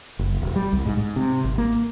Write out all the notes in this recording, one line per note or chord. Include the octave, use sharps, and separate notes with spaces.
F#1
E1
G3
C2
G#2
G#2
C3
G#1
A#3